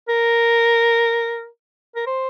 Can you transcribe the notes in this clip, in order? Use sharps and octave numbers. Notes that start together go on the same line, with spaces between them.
A#4
A#4
C5